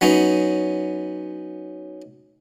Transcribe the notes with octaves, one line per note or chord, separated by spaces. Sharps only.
F#3 B3 C#4 D#4